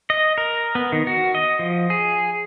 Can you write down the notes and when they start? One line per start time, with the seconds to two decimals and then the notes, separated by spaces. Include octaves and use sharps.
0.10 D#5
0.38 A#4
0.75 B3
0.92 D#3
1.07 F#4
1.35 D#5
1.59 F3
1.90 G#4